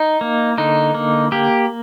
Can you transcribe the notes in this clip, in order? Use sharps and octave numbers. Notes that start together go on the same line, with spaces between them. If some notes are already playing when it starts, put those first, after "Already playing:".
Already playing: D#4
A#3
D3 D#4
A#3
A#3 G4